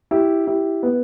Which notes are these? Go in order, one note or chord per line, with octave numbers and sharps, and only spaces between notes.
E4 G4
E4 G4
B3